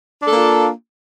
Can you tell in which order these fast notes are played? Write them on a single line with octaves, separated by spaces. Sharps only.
D4 A4 A#3 F4